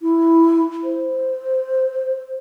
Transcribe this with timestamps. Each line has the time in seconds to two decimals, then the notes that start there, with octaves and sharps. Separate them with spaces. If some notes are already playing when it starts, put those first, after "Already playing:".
0.02 E4
0.84 C5